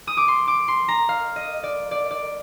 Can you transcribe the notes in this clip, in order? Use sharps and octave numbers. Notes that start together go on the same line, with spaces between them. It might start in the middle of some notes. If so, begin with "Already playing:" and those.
D#6
D6
C6
D6
C6
A#5
F5
D#5
D5
D5
D5